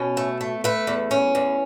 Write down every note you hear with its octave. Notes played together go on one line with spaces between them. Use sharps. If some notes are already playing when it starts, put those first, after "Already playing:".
Already playing: B2 C#4
A3
A3
A3 B4
E2
C#4
E2